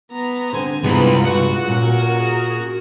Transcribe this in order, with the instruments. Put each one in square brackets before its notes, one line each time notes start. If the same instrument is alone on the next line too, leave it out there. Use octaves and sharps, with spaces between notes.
[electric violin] B3 A#5
[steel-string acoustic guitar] D3 C4 [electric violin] C5 G#5
[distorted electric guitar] C2 B5 [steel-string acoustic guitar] G2 G#3 B3 [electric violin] F4
[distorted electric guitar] F#4
[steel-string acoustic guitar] A#2 C#4 [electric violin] A#4 F#5
[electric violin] G#4 A#4